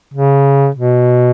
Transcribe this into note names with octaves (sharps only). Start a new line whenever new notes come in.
C#3
B2